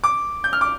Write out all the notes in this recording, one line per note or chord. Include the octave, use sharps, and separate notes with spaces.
D6
G6
F6
D6